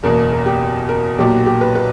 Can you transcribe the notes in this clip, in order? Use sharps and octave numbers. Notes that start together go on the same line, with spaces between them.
F#1 E2 B2 A#3 A#4
A#4
G4
A#4
B1 A#2 F#3 G4
F#4
G4
B4
B4